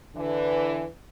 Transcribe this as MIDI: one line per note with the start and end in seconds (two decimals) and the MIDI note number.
0.16 0.85 50
0.16 0.85 52